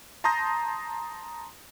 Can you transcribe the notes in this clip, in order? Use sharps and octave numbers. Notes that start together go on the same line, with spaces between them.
A5 A#5 C6 D#6 G6 A#6